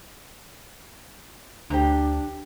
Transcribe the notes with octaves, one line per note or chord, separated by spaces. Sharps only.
D2 D4 G4 C5 A#5